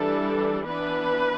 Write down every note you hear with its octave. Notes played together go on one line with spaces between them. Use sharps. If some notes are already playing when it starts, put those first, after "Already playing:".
Already playing: E3 G3 D4 A4
E3 B3 D4 B4